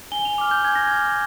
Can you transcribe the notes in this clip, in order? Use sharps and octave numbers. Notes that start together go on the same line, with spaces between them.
G#5 G7
F7
D6 F6 F7
G6
G#5 G#6
A#6
D6 F6 G#6